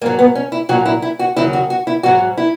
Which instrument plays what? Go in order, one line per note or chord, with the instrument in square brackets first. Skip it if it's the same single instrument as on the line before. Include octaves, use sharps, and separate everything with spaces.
[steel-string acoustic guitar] G#2 A#3
F#3
B3
C#4
E4
A#2 F#3 F#4
E4
E4
F#4
D#2 C#3 F#3 E4
F#4
F#4
E4
G#2 F#3 F#4
E4